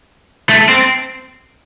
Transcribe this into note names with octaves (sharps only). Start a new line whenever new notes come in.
A3
C4